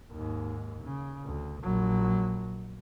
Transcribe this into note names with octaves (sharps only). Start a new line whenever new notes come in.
D#2 G#2
C#3
D2
A#1 F#3